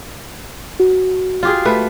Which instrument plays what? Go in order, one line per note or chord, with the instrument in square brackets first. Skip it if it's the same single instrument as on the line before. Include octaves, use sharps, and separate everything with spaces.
[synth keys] F#4
[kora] F4 G4 G#4
A3 B4